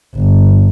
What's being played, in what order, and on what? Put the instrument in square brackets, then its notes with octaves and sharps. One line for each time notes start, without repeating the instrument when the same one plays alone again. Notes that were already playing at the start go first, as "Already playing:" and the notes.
[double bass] G1